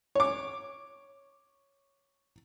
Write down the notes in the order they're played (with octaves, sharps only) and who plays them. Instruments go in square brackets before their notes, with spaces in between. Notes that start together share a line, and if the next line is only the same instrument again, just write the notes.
[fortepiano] C#5 D6